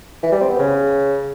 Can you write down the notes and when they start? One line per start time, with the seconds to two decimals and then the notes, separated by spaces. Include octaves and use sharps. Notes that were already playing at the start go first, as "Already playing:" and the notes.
0.23 E3
0.32 G3
0.41 C4
0.50 B3
0.59 C#3